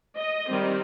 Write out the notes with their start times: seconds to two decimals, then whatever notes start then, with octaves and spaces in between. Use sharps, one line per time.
0.16 D#5
0.50 D#3 G3 C4